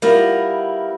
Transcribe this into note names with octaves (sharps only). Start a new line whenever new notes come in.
G3 B3 E4 F4 A#4